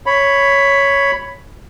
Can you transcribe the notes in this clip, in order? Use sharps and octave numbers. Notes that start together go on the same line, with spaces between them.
C#5 B5